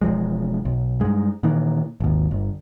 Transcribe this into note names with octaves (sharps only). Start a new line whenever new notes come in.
E1 D#2 F3 G#3
B1
G2 G#3
A#2 D#3 E3
G#1 D#2
G1